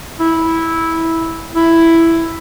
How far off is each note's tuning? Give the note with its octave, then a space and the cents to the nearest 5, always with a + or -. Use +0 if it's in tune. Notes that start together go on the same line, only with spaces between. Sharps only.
E4 -10
E4 +5